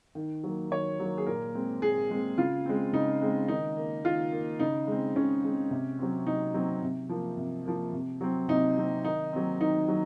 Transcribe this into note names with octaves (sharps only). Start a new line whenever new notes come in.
D#3
F#3 A#3
D#3 C#5
F#3 A#3
G#4
A#2 A#4
G#3 C4
A#2 G#4
G#3 C4
C#3 F4
G#3 C4
C#3 D#4
G#3 C4
D#3 D#4
A#3
D#3 F4
A#3
C#3 D#4
G#3 C4
C#3 C#4
G#3 C4
C3
F#3 C4
C3 D#4
F#3 C4
C3
F3 A#3
C3
F3 A#3
C3
F#3 C4
C3 D#4
F#3 C4
D#3 D#4
F#3 C4
D#3 D#4
F#3